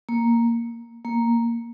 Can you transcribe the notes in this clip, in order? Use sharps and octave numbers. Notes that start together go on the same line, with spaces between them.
A#3
A#3